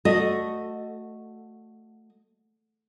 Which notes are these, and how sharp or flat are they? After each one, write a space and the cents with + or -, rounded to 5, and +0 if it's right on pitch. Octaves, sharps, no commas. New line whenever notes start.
A3 +5 F#4 -10 D#5 +0